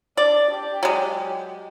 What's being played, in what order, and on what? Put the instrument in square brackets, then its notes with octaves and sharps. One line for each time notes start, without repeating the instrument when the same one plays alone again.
[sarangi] D4 [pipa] D5
[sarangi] G4
[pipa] F#3 G#3